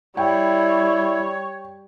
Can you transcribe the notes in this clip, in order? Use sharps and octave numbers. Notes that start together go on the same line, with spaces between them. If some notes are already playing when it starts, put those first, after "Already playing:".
G3 E4 C#5 G5